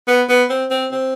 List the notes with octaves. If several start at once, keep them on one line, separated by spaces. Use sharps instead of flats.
B3
B3
C4
C4
C4